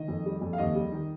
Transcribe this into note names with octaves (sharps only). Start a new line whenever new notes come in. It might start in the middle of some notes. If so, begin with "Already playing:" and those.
Already playing: D#3 D#5
F2
G3
F2
F5
D#2 D#5
G3
D#3